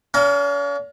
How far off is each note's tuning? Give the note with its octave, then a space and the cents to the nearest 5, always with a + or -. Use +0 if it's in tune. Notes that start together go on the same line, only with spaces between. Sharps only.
C#4 +45 F5 +0 A#5 +5